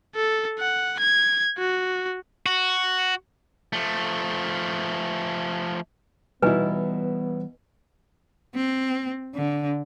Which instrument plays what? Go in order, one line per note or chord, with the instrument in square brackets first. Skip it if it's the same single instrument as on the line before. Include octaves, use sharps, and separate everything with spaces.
[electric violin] A4
F#5
G#6
F#4
[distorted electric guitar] F#4
F3 A3
[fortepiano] B2 D#4 E4 [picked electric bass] E3 G3 [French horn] B3 [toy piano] B4 G#5
[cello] C4
D3